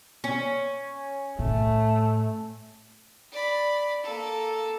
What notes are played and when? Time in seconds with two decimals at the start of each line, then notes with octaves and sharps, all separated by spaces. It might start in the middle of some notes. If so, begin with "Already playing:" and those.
0.24 C#4
1.39 A2 A3
3.32 D5 B5
4.03 A#3 A4